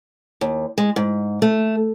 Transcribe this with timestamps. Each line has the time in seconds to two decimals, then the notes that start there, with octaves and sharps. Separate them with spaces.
0.41 D#2
0.78 G#3
0.96 G#2
1.42 A3